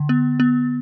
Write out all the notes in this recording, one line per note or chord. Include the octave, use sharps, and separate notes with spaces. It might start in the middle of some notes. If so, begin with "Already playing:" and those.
Already playing: D3
B3
B3